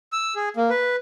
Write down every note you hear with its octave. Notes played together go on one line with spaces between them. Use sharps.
E6
G#4
A#3
B4